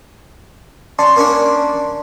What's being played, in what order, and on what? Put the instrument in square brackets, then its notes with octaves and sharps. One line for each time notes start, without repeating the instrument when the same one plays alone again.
[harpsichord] C#4 [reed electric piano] D5 A5 C6
[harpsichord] A#3 C#4 D4